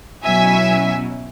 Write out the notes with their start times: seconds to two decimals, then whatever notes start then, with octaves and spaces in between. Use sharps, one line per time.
0.23 B2 F#3 C#4 E4 E5 G#5